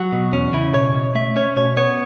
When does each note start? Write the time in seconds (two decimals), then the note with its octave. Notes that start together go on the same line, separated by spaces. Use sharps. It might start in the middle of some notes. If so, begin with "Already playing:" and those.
Already playing: F#3 F#4
0.13 B2
0.33 E2 C#4
0.53 C#3 E4
0.74 B2 C#5
0.95 B2
1.15 A3 E5
1.36 C#4 C#5
1.57 B2 C#5
1.77 B3 C#5